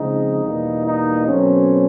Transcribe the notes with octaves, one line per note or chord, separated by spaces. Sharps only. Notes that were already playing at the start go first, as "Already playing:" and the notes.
Already playing: C#3 F3 G#3 C4 D#4
E2 B2 G3 A#3
D#4
B2 F#3 A3 C4 C#4